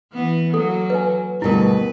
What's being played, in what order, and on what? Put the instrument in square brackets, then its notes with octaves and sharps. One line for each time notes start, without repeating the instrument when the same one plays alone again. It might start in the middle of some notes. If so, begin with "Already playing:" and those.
[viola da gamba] E3 B3
[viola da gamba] F#3 A#3 [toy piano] A4
[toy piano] B4 G#5
[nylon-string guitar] D2 B2 G3 [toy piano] E4 A#4 [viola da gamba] B4